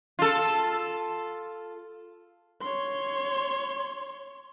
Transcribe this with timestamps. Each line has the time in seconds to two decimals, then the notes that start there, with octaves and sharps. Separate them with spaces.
0.19 F4 A4
2.61 C#5 C6